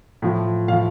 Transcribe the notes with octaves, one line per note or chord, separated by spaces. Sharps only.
A2 F3
A2 F5
F3